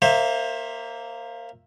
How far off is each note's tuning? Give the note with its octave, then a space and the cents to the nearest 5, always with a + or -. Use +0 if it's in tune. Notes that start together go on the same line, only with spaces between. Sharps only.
A#3 -10 C5 +30 E5 +0